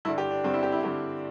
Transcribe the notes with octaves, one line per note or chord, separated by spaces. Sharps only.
G2 D3 E4
G4
D4
G2 D3 C4
E4
G4
E4
G2 D3 G4